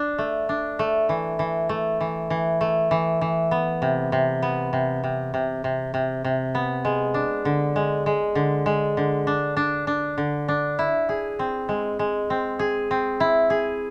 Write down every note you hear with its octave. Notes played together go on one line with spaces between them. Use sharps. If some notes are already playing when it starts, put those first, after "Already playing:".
Already playing: D4
A3
D4
A3
E3
E3
A3
E3
E3
A3
E3
E3
B3
C3
C3
B3
C3
C3
C3
C3
C3
C3
B3
G#3
D4
D3
G#3
G#3
D3
G#3
D3
D4
D4
D4
D3
D4
E4
G#4
C4
G#3
G#3
C4
G#4
C4
E4
G#4